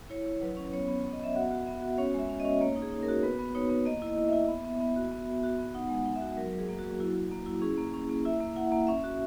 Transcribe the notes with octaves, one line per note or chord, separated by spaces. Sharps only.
E4 C#5
E4
F#3 B4
C#4
B3 C#5
B3
B3
D#5
B3 E5
F#4 F#5
F#4
B3 E5
F#4
C#4 C#5
G#3 E5
C#4
D#5
C#4
A#3 C#5
D#4
G#4
D#4
A#4
F#4
B3 B4
B3
D#4 C#5
B3
A#3 D#5
E4 D#5
E4
E4 E5
B3
B3
B3
F#4
B3
B3
F#4
B3
D#4 F#5
G#3
F#5
D#4
E5
F#4
F#3 A#4
F#3
G#4
A#3
F#4
F#3
E4
E4
A#3
E4
C#4 G#4
A#3
C#4
A#3
E4 E5
A#3
E4 F#5
A#3
C#4 E5
F#4